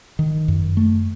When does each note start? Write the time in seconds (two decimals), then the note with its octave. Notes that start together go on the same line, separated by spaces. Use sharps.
0.19 D#3
0.48 F#2
0.77 A3